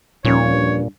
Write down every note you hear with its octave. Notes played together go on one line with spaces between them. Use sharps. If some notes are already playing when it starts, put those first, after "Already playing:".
D#1 D#2 A#2 F3 C#4 C#5
G2